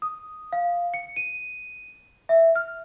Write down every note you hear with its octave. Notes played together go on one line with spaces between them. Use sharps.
D#6
F5
C#7
D#7
E5
F6